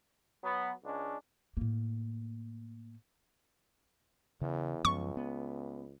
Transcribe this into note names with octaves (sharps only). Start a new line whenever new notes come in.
F#3 B3
C#2 G#3 C#4 D4
A2 A#3
E2 C#3
C#2 F#2 F3 B3 C#6
B3